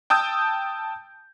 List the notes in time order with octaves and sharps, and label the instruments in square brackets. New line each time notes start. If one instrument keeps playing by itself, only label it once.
[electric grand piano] G5 A5 D#6 E6 G6